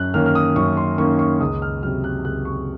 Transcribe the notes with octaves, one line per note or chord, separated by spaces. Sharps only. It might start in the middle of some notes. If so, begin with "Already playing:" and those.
Already playing: F#2 F#6
D#3 A#3 C#4 F6
F6
D#6
F#2 C#6
C6
D#3 A#3 C#4 C#6
C#6
C#2 D#6
F6
C3 F#3 F6
F#6
C#2 F#6
C#6